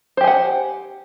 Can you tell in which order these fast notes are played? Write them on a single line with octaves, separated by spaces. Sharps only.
C5 G4 G#5 F#5